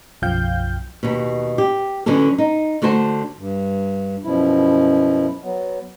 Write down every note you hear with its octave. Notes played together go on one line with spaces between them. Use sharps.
B1 F#2 F3 F5 G5 G6
D#2 B2
G4
D3 E3 F#3 C#4 A4
D#4
D3 A3 F#4 C5 A5
G2
F#2 B2 F3 E4
F#3 B3